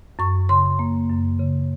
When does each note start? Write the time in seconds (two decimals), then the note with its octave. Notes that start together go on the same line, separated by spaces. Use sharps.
0.19 F#2 C#6
0.49 C#3 C6
0.79 A#3
1.09 F#2
1.39 C#3